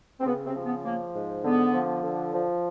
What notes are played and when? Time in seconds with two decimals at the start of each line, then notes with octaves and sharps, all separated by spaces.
0.21 C4
0.26 C#3 B3
0.46 C3 C4
0.56 F3
0.66 B3
0.85 F3 A#3
1.15 G#2
1.45 D3 B3
1.74 F3
2.03 D3
2.33 F3